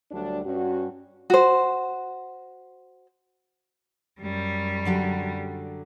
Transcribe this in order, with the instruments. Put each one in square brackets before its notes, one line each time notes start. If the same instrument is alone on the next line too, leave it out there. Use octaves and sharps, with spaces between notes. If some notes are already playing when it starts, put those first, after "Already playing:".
[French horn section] D2 F#3 G3 D4
G2 C#4 F#4
[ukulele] F#4 C5
[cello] F#2 G3
[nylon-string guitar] D3 F#3 G4